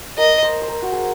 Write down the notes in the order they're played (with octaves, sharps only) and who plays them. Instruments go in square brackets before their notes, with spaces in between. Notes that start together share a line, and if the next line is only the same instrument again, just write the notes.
[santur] A#4 [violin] D#5
[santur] C5
C5
A#4
F#4
G#4